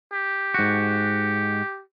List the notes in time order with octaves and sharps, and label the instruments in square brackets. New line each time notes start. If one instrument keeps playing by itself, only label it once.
[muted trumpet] G4
[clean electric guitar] G#2 F#4